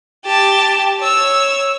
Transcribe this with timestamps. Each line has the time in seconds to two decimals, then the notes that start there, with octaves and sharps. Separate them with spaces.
0.25 G4 A5
0.99 C#5 E6